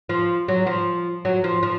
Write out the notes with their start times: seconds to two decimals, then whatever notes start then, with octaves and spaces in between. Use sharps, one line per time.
0.09 F3
0.48 F#3
0.67 F3
1.25 F#3
1.44 F3
1.63 F3